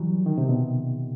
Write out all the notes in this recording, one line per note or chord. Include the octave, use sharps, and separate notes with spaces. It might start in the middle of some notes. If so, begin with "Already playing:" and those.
Already playing: E3 F#3 G3
D#3
C3
B2